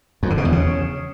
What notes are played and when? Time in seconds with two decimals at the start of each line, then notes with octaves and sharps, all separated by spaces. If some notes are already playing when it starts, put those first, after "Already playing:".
0.23 F2
0.30 D3
0.38 B2
0.45 E2
0.52 C#3